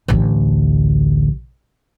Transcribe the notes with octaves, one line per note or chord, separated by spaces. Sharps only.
A1 D2